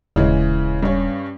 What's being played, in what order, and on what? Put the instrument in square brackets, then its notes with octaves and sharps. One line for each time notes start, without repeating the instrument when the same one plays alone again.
[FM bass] D#1 [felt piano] C#3 E3 G#3
[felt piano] G2 C#4